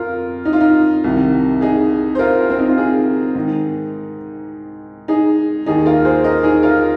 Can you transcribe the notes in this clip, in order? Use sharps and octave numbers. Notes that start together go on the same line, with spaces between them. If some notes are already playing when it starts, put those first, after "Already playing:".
Already playing: F2 F4 A#4
D#4
F4
D#4
C2 C3 D#3
D#4 G#4
C5
F4 A#4
C4
D#4
F4
D#4 G#4
G#2 D#3
D#4 G#4
D#2 D#3 D#4 G#4
F4 A#4
G#4 C5
A#4 D#5
D#4 G#4
F4 A#4